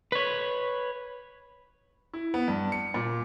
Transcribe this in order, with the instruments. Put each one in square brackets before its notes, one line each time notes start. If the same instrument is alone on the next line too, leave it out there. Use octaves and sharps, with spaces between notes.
[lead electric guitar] B4 C#5
[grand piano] E4
B3
G2
C#7
A#2